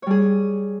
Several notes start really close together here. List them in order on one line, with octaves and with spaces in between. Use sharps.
C#5 G3 G#4